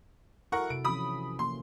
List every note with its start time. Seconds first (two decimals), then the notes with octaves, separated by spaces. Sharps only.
0.52 E4 F#4 A4 A#4 F#5 C#6
0.70 C3 D7
0.85 E3 F3 C#4 B5 D#6
1.39 A#3 C6